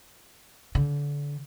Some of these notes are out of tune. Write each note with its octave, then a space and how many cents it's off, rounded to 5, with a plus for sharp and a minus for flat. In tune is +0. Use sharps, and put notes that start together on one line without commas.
D3 -30